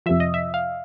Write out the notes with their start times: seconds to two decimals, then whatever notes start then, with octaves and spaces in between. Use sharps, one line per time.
0.06 F2 C3 F3 E5
0.20 D#5
0.34 E5
0.54 F5